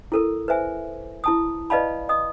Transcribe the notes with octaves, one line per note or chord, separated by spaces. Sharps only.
E4 A4 A#4
B4 C5 E5 G#5
E4 A5 D#6
B4 D5 D#5 F5 A5 B5
D#5 D#6